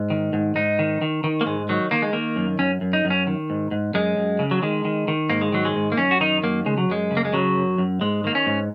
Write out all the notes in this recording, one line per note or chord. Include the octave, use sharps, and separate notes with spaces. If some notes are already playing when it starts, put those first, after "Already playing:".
Already playing: G#2
D#3
G#2
G#2 D#4
D#3
D#3
D#3
A#3
G#2 G#3
D#3 F#3
D#3 A#3
G#3
D#3 A#3
F#2
F#2 C#4
F#2
D#4
F#2
C#4
D#3
G#2
G#2
F#2 G#3
F#2
C#3
F#3
D#3 G#3
D#3
D#3
G#2 A#3
G#3
D#3 F#3
G#3
G#2
A#3
F#2 C#4
F#4
D#3 D#4
F#2 A#3
C#3 G#3
F#3
F#2 G#3
C#3
A#3
G#3
C#3 F#3
F#2
F#2
G#2 G#3
D#3 A#3
C#4
G#2